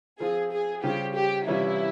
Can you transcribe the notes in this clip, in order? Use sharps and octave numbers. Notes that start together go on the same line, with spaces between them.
F3 C4 F4 G#4
G#4
C#3 G3 C#4 F4 G4 C5
G4
C3 E3 G3 C#4 E4 F4